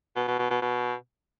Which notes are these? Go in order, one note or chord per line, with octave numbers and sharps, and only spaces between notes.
B2
B2
B2
B2
B2